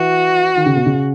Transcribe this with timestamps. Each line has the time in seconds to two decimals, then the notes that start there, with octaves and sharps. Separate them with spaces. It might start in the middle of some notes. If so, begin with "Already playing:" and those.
Already playing: E3 F#4
0.56 D#3
0.66 C#3
0.76 B2
0.86 C#3